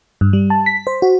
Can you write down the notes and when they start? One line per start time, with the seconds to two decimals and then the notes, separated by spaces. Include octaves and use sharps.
0.21 G2
0.33 G3
0.50 A5
0.66 B6
0.87 C5
1.02 F#4